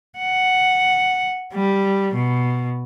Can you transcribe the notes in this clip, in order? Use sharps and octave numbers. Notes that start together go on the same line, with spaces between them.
F#5
G3
B2